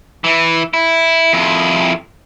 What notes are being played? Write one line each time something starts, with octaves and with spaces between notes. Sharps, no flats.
E3 E4
E4
F2 E4